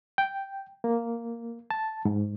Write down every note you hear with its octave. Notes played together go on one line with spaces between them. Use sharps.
G5
A#3
A5
G#2